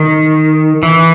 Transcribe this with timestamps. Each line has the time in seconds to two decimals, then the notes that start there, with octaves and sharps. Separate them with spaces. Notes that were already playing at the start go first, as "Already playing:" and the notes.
Already playing: D#3
0.83 E3